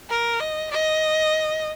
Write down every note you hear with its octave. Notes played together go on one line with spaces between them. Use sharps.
A#4
D#5
D#5